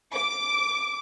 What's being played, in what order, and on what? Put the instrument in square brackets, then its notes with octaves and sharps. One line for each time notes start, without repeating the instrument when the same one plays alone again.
[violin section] D6